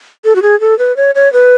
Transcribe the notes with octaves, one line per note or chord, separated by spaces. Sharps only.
A4
F#4
G#4
A4
B4
C#5
C#5
B4